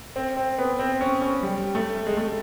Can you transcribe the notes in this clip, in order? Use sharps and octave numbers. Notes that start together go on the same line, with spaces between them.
C4
C4
B3
C4
C#4
C#4
G3
A3
G#3
A3